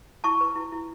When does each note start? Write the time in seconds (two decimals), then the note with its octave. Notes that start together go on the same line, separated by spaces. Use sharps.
0.24 E4 A5 C#6
0.41 B4
0.55 E4
0.72 E4